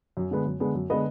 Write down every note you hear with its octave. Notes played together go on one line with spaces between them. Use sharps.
F#2
D3 G#3 B3
F#2
D3 G#3 B3
F#2
D3 G#3 B3 B4 D#5